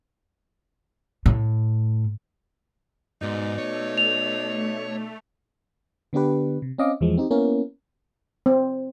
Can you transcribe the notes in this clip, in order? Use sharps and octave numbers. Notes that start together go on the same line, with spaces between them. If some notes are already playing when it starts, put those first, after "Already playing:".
A2
G#2 B2 D#4 D5
A3 C#5
F7
D3 B3 D4 G4 B4
C3
C4 C#4 D#5 F5 D6
E2 E3 F3 G#3
C4 D#4 G4
A#3 B3 C#4 E4 A#4
C4